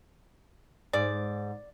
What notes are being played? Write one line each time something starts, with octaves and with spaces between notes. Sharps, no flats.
G#2 D5